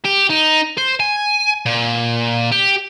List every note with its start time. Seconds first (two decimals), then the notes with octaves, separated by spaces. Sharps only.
0.05 G4
0.30 D#4
0.78 C5
1.00 G#5
1.66 A#2
2.52 G4